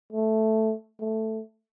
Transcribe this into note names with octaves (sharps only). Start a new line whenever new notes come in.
A3
A3